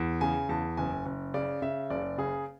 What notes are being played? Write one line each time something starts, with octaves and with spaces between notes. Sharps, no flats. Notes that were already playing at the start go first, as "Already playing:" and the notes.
Already playing: E2
C#3 G#5
E2 A5
F#1 G#5
F#1
C#3 D5
C#3 E5
F#1 D5
C#3 G#4